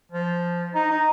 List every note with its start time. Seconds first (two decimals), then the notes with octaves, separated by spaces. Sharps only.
0.12 F3
0.75 D#4
0.91 D#4